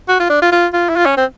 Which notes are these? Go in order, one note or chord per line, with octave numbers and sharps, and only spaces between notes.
F#4
F4
D4
F4
F4
F4
E4
F4
C#4
C4